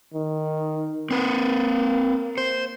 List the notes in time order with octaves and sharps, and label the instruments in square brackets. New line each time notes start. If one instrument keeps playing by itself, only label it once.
[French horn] D#3
[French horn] A#3 [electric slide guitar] C4 B4
[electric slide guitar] C5